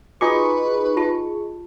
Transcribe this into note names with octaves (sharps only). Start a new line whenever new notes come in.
D#4 F4 F#4 G#4 B4 C#6 D6
F4 G4 A5